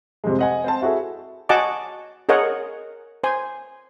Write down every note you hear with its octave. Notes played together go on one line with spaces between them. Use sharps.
F2 C3 F3 G3 G#3
D#5 F#5 G#5
C4 C5 A5
E4 F#4 G#4 A4 E5
F#4 D#5 F#5 G#5 A5 D6
G#4 A#4 C#5 D#5 F#5
C5 G#5